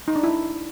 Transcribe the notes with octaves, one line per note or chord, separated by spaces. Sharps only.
D#4
D4
E4